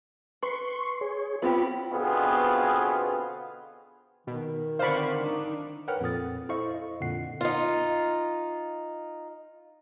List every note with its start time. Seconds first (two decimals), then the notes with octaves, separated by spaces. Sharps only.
0.43 B4 C6 C#6
1.01 G#4 C#5
1.42 B3 C4 F4 G4 B5
1.91 B2 D3 B3 C4 F4 G#4
4.27 B2 D#3
4.79 D3 C4 C5 D5 F5 B5 C#6
5.21 D4 D#4
5.88 A#4 B4 C#5 F#5 G5 F6
6.01 F2 A#2 A4 D#6 A6
6.49 E4 A4 C5 D#5 F5 C#6
6.75 D#5
7.01 F2 A#2 D3 F#5 C7
7.41 D#4 F4